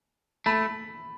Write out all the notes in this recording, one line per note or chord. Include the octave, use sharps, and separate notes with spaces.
A3 B5